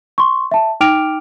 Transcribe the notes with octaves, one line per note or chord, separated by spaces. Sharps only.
C6 C#6
E5 A5
D#4 G5 D6 F6 D7 F7